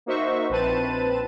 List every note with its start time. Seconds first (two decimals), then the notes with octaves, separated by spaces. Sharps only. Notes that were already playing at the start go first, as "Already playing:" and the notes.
0.06 A#3 D#4 F#4 C5 E5 C#6
0.50 A#1 C4 B4 C5 A5 D#7